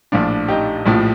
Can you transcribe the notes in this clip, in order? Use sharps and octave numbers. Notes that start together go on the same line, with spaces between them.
A#1 A2 F3 D4 F4
D#4 G4
A#1 A2 F3